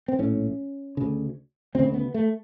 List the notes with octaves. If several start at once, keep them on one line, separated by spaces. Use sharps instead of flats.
C4
A#1 A2 C#4
D2 C#3
D2 C#3 C4
C4
B3
A3